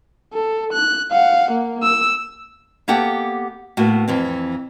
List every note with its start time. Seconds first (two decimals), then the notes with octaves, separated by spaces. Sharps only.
0.34 A4
0.73 F#6
1.12 F5 F#5
1.51 A#3
1.83 E6
2.88 A#3 B3 G4 A4 F#5 G5
3.77 A2 A#3 B3 F#4
4.08 F2 E3 C4